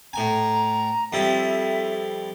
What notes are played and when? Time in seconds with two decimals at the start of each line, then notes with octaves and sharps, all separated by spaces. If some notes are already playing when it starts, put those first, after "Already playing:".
0.13 A2 G#5 A#5
1.13 F2 G3 E4 E5